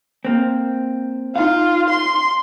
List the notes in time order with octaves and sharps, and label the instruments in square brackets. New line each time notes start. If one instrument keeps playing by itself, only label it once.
[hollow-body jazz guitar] A#3 C4
[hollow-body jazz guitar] D#4 F5 [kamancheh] F4
[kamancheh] C6